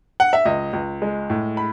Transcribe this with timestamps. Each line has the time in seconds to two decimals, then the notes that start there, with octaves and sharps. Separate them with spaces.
0.20 F#5
0.33 E5
0.45 C#2 D#5
0.73 C#2
1.02 G#3
1.30 A2
1.57 B5